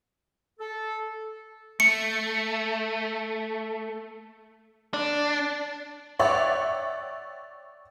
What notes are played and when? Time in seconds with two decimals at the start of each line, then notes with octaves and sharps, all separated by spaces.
0.59 A4
1.80 A3 C#7
4.94 D4
6.19 C#5 D5 E5 F#5 G5